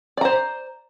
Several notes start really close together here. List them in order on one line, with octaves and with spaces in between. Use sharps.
D5 A#5 C5